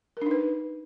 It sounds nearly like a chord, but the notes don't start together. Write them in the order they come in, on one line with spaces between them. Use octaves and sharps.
A#4 D4 D#4 B4